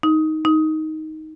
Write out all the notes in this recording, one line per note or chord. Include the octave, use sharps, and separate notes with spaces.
D#4
D#4